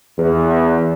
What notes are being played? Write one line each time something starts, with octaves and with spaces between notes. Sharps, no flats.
E2